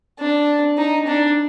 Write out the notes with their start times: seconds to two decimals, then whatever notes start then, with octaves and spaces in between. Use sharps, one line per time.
0.19 D4
0.78 D#4
1.07 D4